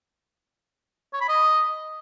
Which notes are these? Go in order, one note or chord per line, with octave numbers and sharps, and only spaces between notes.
C#5
B5
D#5